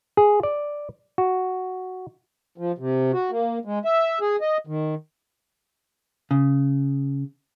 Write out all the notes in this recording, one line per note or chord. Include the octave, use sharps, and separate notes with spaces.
G#4
D5
F#4
F3
C3
F#4
A#3
G#3
E5
G#4
D#5
D#3
C#3